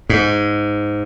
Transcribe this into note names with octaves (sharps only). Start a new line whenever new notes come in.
G#2